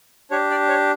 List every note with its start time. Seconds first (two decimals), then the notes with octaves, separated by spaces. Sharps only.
0.31 D4 G4 C#5
0.50 D5
0.69 C#5